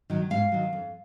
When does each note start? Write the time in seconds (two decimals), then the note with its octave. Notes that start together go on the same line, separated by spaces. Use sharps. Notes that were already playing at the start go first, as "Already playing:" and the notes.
0.10 D#3 F#3
0.30 G#2 F5
0.52 D#3 F#3
0.73 F2